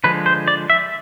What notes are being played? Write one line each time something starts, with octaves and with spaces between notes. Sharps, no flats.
D3 F3 G#3 B4
C5
D5
E5